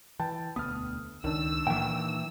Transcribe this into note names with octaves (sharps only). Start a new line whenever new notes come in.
E3 G5 A5
E1 D2 B3 D#6 F6
C#2 D#3 D4 E6
A#2 E3 G5